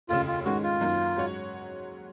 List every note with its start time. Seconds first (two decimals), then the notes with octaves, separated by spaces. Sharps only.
0.09 F1 D#2 C#3 F4
0.27 F4
0.45 G#2 D#3 G#3 C#4 F#4
0.63 F4
0.81 F#2 D#3 A#3 C#4
1.16 G#2 F#3 C#4 F#4 C#5